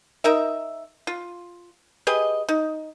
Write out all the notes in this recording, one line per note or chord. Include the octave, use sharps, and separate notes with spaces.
D#4 A#4 E5
F4
G4 G#4 B4 D#5
D#4